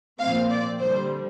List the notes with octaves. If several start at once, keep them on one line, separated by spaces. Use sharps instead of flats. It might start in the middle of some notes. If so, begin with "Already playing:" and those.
A#2 F3 C4 F5
D5
D3 G3 C4 C5